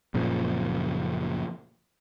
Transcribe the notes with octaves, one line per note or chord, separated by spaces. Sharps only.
F#1 A#2 C#3 F3